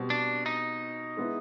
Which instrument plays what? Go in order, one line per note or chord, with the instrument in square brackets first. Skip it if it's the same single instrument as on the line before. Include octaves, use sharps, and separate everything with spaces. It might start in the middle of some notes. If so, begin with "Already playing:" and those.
Already playing: [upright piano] B2 G3 C4
[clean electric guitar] D4
D#4
[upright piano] G#3 B3 E4